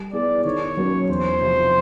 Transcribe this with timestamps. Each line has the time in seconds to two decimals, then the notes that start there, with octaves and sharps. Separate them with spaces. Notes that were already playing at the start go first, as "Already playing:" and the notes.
Already playing: G3
0.13 B3 E4 G#4 D5
0.44 D#3 C#5
0.77 F#3 A#3 C#4 F#4
1.09 E2 C5
1.41 C3 F3